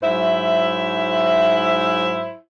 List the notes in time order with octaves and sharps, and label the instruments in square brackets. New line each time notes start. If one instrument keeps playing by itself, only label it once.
[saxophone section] G#2 F#3 E4 C5 E5